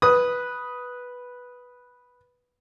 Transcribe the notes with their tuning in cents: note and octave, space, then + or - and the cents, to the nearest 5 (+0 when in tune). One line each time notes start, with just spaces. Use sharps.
B4 -5 D#6 +5